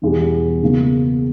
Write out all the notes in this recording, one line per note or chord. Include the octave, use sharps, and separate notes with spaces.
E1 E2 B2 G3
C#2 B2 A#3